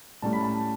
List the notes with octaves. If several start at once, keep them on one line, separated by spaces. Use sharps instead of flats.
A2 G3 C#4 A5
B5
A5